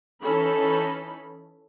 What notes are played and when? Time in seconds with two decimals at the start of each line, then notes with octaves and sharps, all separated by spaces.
0.22 E3 C#4 D#4 A4 B5